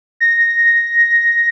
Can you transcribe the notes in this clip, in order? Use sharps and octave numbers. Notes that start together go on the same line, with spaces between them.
A#6